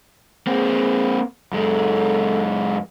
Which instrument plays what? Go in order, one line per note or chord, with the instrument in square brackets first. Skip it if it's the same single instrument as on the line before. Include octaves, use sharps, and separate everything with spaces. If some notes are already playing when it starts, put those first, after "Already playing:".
[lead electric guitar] A#3 C4 [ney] G#4
[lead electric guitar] F#2 G#3 [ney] A4